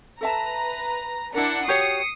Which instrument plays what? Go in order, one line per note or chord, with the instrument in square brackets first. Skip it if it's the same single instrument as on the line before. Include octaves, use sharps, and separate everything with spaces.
[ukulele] A4 E5 A5 [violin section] B4 A#5
[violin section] D4 F#5 [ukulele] E4 A#4
[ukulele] F#4 G4 C#5 [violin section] D#6 C7 C#7